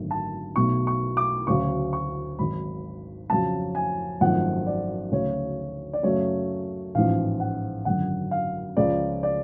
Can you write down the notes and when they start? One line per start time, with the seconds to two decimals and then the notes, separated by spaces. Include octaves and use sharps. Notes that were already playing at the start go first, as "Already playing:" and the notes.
Already playing: G#1 F#2 D3 F#3 A3
0.11 A5
0.56 B1 B2 F#3 A3 C#6
0.87 C#6
1.17 D6
1.47 D2 C#3 F#3 C#6
1.93 C#6
2.39 G#1 G#2 F#3 B5
3.30 F2 C#3 F#3 A5
3.75 G#5
4.20 G#1 F#2 F3 A3 F#5
4.67 D5
5.12 D2 C#3 F#3 A3 C#5
5.93 D5
6.03 F#2 C#3 F#3 A3 C#5
6.95 A1 G#2 F3 F5
7.40 F#5
7.85 G#1 F#2 D3 F#3 F#5
8.31 F5
8.77 C#2 C#3 F3 G#3 D5
9.23 D5